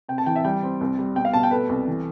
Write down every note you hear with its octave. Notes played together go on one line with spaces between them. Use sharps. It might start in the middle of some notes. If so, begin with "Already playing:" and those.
C3 G5
A5
E3 G5
E5
G3 G5
C4
C2
G3
B2 G5
F5
B2 A5
G5
A3 B4
C2
E3